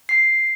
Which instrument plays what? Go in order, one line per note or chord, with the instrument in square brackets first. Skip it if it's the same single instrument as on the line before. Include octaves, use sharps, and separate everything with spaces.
[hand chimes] C7